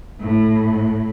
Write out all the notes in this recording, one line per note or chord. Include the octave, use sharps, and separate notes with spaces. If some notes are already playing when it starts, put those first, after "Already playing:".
A2